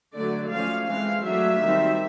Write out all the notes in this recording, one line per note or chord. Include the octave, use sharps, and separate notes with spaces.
D3 F#3 A3 D5
F3 A3 C#4 F5
E3 G#3 C4 F5
F#3 A3 D4 E5
D#3 G3 C4